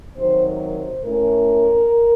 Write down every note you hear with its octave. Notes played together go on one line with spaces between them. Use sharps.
C3 D#3 F#3 C5
A#4
C5
A2 A3 C#4 A#4